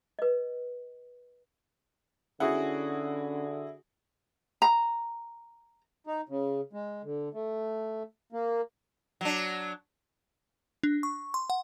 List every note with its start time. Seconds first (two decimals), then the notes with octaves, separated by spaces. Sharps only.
0.19 B4 D#5
2.40 D3 C#4 E4 F#4 G#4 F#5
4.62 A#5
6.07 D#4
6.29 C#3
6.73 G#3
7.04 D3
7.34 A3
8.33 A#3
9.21 F#3 D4
10.83 D4
11.03 C#6
11.34 C6
11.50 F#5